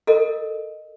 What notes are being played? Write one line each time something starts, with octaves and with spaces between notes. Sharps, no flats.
A4 A#4 D#5